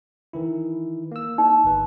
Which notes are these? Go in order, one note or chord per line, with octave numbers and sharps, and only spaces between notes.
D#3 E3 E4
A#3 E6
D#4
G1 B4